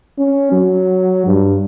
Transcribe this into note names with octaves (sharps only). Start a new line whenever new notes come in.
C#4
F#3
G2